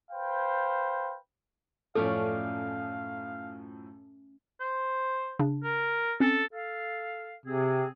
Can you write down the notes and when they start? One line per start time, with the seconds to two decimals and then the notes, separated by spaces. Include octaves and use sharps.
0.11 B4 C5 F5 G5
1.95 F#2 A2 F3 A3 C#4 A4 D5 F5
4.60 C5
5.39 C#3 D4
5.64 A#4
6.20 C4 C#4 A4
6.52 A4 F5
7.46 C3 C4 G#4